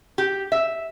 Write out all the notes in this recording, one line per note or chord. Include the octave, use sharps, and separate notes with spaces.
G4
E5